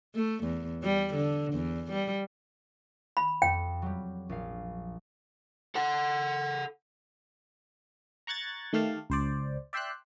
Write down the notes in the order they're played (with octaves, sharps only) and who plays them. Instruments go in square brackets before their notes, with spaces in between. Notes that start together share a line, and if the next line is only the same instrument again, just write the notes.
[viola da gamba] A3
E2
G3
D3
E2
G3
[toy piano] B5
[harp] F2 [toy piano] G5
[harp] F#3 G3
A#1 F5
[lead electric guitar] A4 F#5
[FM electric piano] A#5 C#6 F#6 G#6 A6
D#3 A3 G4 F5 A5
C#2 C5 D5
D5 E5 G5 C6 E6 F#6